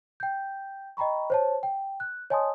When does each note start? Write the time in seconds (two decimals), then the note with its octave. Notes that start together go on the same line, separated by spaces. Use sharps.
0.20 G5 G6
0.97 D#5 G5 A#5 B5 C#6
1.30 C5 C#5 A5
1.63 G5
2.00 F#6
2.30 C#5 D#5 G#5 A5 C6 D#6